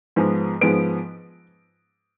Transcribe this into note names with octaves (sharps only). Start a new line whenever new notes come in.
G#2 F3 G#3 B3
G#2 F3 G#3 B3 D7